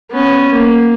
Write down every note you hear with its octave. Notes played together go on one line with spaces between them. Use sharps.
B3 C#4
A#3